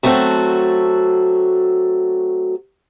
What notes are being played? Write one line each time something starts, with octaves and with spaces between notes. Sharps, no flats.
F#3 A3 B3 C4 F#4 A4